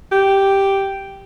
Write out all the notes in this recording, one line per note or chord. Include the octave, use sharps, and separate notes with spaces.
G4